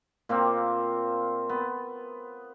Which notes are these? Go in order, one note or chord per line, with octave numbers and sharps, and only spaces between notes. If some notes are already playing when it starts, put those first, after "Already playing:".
A#2 A#3 C4
B3